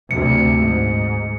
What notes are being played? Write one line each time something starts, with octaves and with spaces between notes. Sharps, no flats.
D2 C3 C#7
G#2